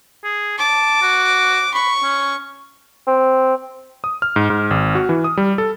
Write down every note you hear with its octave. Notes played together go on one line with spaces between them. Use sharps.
G#4
A5 D6
F#4
B5 C#6
C#4
C4
D#6
F6
G#2
G#2
G#1
F#4
E3
D#6
G3
A4